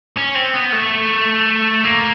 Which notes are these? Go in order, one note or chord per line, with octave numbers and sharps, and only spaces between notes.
C#4
C4
B3
A3
A#3